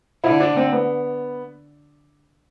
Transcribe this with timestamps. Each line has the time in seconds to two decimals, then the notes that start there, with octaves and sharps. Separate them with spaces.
0.24 D3 E4
0.40 D4
0.56 C4
0.72 B3